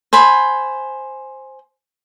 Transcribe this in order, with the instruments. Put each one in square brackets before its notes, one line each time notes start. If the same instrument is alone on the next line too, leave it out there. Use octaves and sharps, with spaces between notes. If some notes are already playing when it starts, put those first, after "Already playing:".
[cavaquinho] C5 G#5 B5